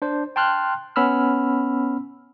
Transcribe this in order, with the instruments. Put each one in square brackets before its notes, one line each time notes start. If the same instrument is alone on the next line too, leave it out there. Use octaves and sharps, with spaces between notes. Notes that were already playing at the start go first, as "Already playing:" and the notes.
[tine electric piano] D4 C5
G5 A5 C6 F6 F#6
B3 C#4 B5 E6 F6